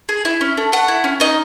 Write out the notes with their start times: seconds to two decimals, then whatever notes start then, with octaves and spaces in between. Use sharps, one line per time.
0.09 G#4
0.25 E4
0.41 C#4
0.57 A3
0.72 A3 F#5
0.88 E4
1.04 C#4
1.20 D#4 D#5